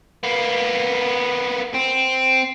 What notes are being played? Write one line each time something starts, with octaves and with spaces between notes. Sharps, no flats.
A#3 B3
C4